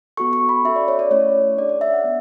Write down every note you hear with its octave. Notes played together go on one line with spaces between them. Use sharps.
B3 F#4 A4 C#6
C#6
B5
C#4 F#4 A4 E5
D5
C#5
D5
A3 C#4 E4 C#5
D4 G#4 D5
D5
E5
F#5
B3 D4